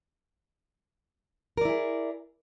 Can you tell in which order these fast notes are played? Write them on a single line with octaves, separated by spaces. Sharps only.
A#4 D5 E4 G#4